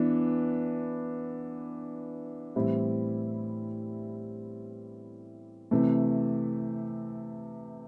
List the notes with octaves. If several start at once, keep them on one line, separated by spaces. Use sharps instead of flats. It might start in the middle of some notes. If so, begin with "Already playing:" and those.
Already playing: E3 B3 D4
A2 E3 G3 C4 E4
C3 E3 A3